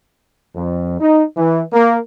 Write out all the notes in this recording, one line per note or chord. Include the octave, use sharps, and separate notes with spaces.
F2
D#4
E3
A#3